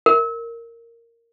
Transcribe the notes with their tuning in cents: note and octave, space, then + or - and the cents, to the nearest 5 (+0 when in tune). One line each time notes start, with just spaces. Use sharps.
A#4 -10